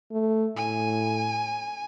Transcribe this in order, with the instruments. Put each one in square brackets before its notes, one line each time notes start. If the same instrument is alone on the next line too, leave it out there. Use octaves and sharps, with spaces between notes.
[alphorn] A3
[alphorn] A2 [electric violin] G#5